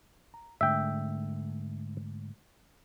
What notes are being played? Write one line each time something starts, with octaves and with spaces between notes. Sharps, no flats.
A#5
G#2 D3 A3 E5 G5